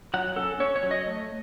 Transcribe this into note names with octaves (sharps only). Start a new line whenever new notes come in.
F#3 F#5
C#4 A4
C#4 C#5
C#5
F#3
D#5
A3